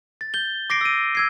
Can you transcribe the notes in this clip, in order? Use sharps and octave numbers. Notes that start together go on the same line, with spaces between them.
A6
G6 G7
D6 A#6 C7 D7
E6 D#7
E6 G#6 C7